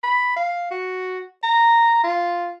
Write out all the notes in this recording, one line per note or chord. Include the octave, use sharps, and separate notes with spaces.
B5
F5
F#4
A#5
F4